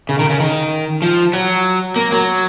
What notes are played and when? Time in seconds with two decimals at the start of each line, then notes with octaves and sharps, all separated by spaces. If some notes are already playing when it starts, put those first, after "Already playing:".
0.09 C#3
0.19 D#3
0.29 C#3
0.40 D#3
1.02 F3
1.34 F#3
1.96 A#3
2.12 F#3